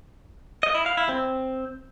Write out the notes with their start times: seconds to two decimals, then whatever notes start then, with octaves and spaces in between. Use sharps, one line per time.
0.63 D#5
0.75 E4
0.86 F5
0.97 E4
1.09 C4